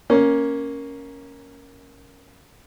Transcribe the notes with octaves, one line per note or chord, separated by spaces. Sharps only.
A#3 C#4